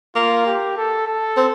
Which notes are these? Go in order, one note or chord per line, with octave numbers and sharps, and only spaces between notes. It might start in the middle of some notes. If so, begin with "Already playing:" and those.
A#3 F4
G4
A4
A4
C4